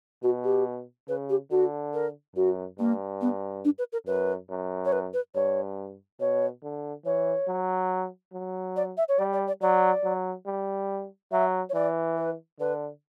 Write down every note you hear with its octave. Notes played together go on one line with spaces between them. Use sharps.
B2 F#4
G4
C#3 B4
G4
D3 F#4
A#4
F#2 F#4
G2 A#3
B3
D4
B4
A#4
F#2 B4
F#2
C#5
B4
B4
G2 C#5
B2 C#5
D3
E3 C#5
F#3
F#3
D5
E5
C#5
G3 D5
D5
D5
F#3 D5
F#3
G3
F#3 E5
C#5
E3 D5
B4
D3 B4